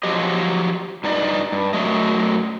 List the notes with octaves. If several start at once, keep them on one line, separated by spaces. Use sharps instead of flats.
F3 F#3 F4 G4 D#5
G2 D#4 D5 D#5
G2
F#2 F#3 A3 D#5